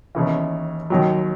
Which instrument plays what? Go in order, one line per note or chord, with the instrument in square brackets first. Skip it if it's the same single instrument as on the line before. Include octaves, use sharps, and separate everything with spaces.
[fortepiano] D#2 C#3 E3
D#2 D#3 F#3